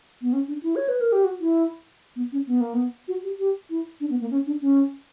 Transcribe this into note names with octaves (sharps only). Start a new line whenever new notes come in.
B3
C#4
D4
E4
C#5
B4
A#4
G4
F#4
E4
B3
C#4
B3
A#3
B3
F#4
G4
G4
E4
D4
B3
A#3
C#4
D4
C#4